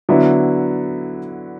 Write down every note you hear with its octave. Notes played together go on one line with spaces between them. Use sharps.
D3 F#3 B3 E4